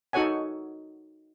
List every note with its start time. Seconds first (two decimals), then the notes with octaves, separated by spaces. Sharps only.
0.13 D#4 F#4 A4 C#5 F#5 G#5